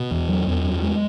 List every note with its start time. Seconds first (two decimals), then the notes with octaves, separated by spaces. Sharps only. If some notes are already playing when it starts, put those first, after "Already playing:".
Already playing: B2
0.11 E2
0.29 F#3
0.47 E2
0.64 F#2
0.82 G#3